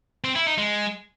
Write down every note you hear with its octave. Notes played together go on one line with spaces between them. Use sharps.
C4
E4
D#4
G#3